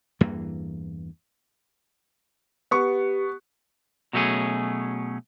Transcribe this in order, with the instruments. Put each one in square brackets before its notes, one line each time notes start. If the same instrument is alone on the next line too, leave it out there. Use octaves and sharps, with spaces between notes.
[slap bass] E2 G2 E3 A#3
[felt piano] B3 C#6 [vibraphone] G4
[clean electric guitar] B2 F#3 A3 C#4 G#4